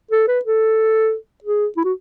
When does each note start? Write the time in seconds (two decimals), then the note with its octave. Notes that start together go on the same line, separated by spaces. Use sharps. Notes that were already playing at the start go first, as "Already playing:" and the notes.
0.12 A4
0.28 B4
0.45 A4
1.44 G#4
1.77 E4
1.85 F#4